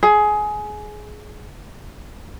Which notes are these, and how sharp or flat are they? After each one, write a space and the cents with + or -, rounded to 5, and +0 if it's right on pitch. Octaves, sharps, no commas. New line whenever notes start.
G#4 +20